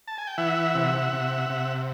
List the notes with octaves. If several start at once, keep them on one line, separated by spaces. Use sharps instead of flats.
A5
G#5
G5
E3 E5 F#5
C3
C3
C3